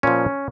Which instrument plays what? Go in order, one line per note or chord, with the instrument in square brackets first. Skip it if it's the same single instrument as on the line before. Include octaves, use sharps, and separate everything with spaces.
[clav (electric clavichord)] A#2 F3 C#4